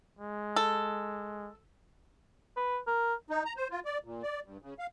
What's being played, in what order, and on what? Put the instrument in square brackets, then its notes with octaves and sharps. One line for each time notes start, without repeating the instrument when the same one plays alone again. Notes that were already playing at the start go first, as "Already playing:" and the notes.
[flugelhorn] G#3
[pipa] A4
[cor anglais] B4
A#4
[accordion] D#4
A#5
C5
F4
D5
A#2
D5
G2
C#3
F5